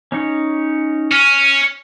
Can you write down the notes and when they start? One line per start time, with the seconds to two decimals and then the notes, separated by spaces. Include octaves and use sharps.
0.12 C#4 D#4 C#5
1.12 C#4 F6